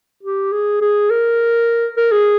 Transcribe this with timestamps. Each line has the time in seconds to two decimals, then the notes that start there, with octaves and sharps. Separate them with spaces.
0.23 G4
0.52 G#4
0.81 G#4
1.10 A#4
1.97 A#4
2.12 G#4